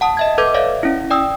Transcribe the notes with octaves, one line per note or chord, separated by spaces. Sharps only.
F#5 A5 D#6
D#5 E5 G#6
A4 B4 D6 G6 G#6
C#5 D5 E5 F5
C#4 E4
D5 G5 D#6 E6